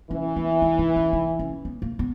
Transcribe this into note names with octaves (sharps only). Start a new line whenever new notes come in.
E3 C#4
B3
D#4
D#4
C#4
D#4
C#4
B3
A#3
B3